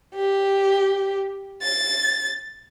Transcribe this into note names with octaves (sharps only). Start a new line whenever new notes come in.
G4
A6